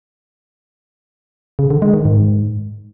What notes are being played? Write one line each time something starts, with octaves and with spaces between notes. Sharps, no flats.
C#3
D3
G#3
D#3
G#2